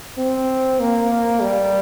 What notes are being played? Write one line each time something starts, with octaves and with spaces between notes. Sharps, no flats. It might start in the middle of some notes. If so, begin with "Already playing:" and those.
C4
A#3
G3